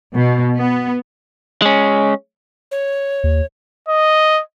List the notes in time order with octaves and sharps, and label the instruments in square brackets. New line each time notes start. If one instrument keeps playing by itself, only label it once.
[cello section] B2
B3
[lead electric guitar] G#3 C#4
[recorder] C#5
[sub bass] D#2
[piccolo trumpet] D#5